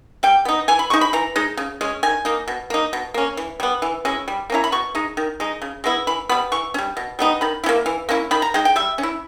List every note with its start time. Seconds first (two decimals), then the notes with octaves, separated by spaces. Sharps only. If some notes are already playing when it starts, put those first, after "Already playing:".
0.23 G3 G5
0.45 B3 D#4
0.68 E3 G#5
0.79 B5
0.90 G#3 D#4 C#6
1.01 B5
1.13 E3 A#5
1.36 G#3 D#4
1.57 C#3
1.81 G#3 C#4
2.03 D#3 G#5
2.25 A#3 D#4
2.48 B2
2.70 A#3 D#4
2.93 B2
3.14 A#3 C#4
3.37 E3
3.60 G3 B3
3.82 E3
4.05 G#3 C#4 E4
4.28 G3
4.50 A#3 C#4 E4 A#5
4.64 B5
4.72 B2 C#6
4.95 G#3 D#4
5.17 D#3
5.40 G#3 D#4
5.62 C#3
5.84 G#3 B3 E4
6.07 E3 B5
6.29 G3 B3 B5
6.52 E3 C#6
6.74 C#4
6.78 G3
6.97 B2
7.19 G3 B3 D#4
7.41 D#3 B5
7.64 C#4 E4
7.69 A#3
7.86 E3
8.09 A#3 C#4 E4
8.31 D#3 B5
8.42 A#5
8.54 G#3 D#4 G5
8.65 G5
8.76 G3 E5
8.98 C#4
9.03 E4